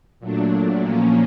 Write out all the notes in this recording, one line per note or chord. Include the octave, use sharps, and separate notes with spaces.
A#2 F#3 A3 D4
A#2 F3 A#3 C#4